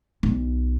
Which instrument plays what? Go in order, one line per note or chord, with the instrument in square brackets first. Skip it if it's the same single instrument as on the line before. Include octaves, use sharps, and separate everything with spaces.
[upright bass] B1